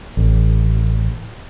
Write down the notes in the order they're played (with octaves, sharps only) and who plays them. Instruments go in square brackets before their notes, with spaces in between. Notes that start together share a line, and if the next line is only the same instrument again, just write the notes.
[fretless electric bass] A1